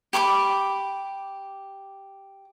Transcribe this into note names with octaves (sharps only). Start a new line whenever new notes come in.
G4 B5 C#6 D6